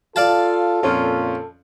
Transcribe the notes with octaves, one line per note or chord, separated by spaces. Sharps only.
F4 A4 D5 F5 A5
F2 A#2 C#4 F4